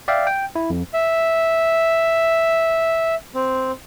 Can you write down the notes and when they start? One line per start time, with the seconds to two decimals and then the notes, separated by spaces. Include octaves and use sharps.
0.08 D5 E5 F5 G5
0.27 G5
0.56 E4
0.70 F2
0.94 E5
3.34 C4